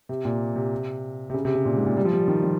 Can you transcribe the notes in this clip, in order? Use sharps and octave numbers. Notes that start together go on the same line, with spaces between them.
C3
A#2
C3
C3
C#3
C3
C#3
A#2
G#2
A#2
G3
F3
G3
D#3
F3